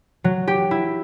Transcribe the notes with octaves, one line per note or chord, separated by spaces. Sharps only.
F#3
G4
E4